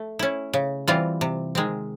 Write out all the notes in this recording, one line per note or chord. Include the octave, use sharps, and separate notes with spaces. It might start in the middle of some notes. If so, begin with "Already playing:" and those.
Already playing: A3
C#4 E4
C#3
E3 G3 C4 F4
C3
D#3 G#3 C4